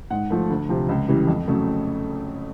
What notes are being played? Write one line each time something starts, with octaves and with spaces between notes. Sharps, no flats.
G#2 F#5
F3 A3
D2
C3 F3
C#2
C#3 E3 G3
F2
C#3 F#3 A3